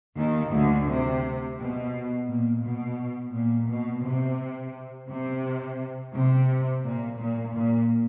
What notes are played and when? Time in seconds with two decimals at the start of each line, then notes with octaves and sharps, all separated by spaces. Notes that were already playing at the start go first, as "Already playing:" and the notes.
0.17 D#2 D#3
0.52 D2 D3
0.87 C3
1.57 B2
2.28 A#2
2.63 B2
3.33 A#2
3.68 B2
4.03 C3
5.08 C3
6.14 C3
6.83 A#2
7.19 A#2
7.55 A#2